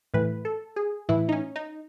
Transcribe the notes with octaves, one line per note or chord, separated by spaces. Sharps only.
A2 E3 B4
A4
G#4
A2 E3 E4
D#4
C#4
D#4